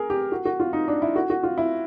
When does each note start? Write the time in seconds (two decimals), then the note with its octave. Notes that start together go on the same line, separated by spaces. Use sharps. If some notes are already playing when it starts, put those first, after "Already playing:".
Already playing: G#4 A#4
0.10 G4
0.32 F#4
0.45 F#4
0.60 F4
0.73 D#4
0.88 D4
1.02 E4
1.16 F#4
1.30 F#4
1.43 F4
1.58 E4